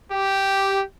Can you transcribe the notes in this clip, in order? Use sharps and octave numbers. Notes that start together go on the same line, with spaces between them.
G4